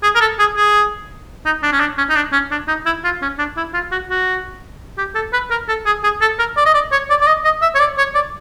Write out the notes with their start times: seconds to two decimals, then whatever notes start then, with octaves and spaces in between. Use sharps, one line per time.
0.03 G#4
0.15 A#4
0.21 A4
0.39 G#4
0.56 G#4
1.45 D#4
1.63 D4
1.72 C#4
1.80 D4
1.98 C#4
2.10 D#4
2.16 D4
2.32 C#4
2.51 D4
2.68 D#4
2.86 E4
3.04 F4
3.22 C#4
3.38 D4
3.57 E4
3.74 F4
3.92 F#4
4.10 F#4
4.98 G4
5.15 A4
5.33 B4
5.51 A#4
5.68 A4
5.86 G#4
6.04 G#4
6.21 A4
6.39 A#4
6.57 D5
6.66 D#5
6.74 D5
6.92 C#5
7.10 D5
7.21 D5
7.27 D#5
7.44 D#5
7.62 E5
7.75 C#5
7.80 D5
7.98 C#5
8.15 D5